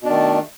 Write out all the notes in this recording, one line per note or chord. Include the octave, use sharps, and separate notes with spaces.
B2 D#3 A3 D4